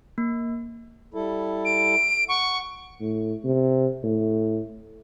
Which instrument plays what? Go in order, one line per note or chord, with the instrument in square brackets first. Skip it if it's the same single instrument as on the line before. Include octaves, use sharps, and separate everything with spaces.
[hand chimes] A#3
[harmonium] G3 E4 A4
[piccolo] D7
[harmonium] F#5 [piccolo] C#6
[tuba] A2
C3
A2